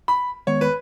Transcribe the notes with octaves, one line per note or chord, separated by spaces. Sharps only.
B5
D#3 G#3 B3 C#5
B4